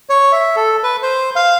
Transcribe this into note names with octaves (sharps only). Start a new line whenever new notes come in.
C#5
E5
A4
B4
C5
F5